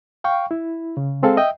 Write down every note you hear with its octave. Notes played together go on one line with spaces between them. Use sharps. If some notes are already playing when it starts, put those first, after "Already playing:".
F5 G5 C#6
E4
C#3
G#3 C4 G#4 A4 F5
D#5 E5 G5